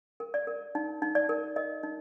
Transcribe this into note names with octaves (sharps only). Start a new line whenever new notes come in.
A#4
D5
A#4
D#4
D#4
D5
A#4
A#4 D#5
D#4